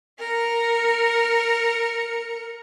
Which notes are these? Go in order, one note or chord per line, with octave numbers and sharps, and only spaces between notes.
A#4 C#7